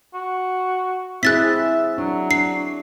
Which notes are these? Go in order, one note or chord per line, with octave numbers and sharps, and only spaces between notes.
F#4
C4 E4 G#4 E5 F#6 A6 B6
F#3 D4
D4 C7